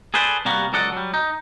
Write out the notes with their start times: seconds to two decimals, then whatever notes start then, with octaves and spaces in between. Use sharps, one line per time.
0.14 G#4 A4 B4 C5 D5
0.45 C3 G3 A#3 B3 F#4
0.73 C#2 F#3 A4 D5 D#5 F#5
0.92 F#3 G3
1.14 D#4